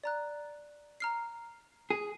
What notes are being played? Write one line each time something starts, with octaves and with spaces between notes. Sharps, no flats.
D5 A#5 F#6
A#5 F6 C7
G#4